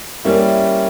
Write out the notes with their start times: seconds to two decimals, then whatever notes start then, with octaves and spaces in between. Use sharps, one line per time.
0.25 G3 A#3 C#4 E4